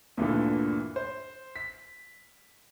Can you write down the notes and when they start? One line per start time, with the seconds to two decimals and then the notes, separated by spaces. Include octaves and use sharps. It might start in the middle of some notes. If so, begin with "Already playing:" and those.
0.17 D2 G2 A#2 D3 E3
0.96 C5
1.56 B6